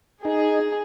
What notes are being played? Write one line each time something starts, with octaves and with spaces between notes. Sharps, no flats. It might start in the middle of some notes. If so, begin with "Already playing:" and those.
D#4 G#4